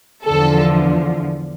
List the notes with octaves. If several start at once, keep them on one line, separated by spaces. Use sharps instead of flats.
E2 D3 F3 A4